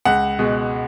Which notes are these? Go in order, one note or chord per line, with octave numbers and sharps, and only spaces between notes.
C#2 F#5
B2 G#3